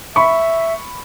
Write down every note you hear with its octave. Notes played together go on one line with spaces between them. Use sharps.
E5 B5 C#6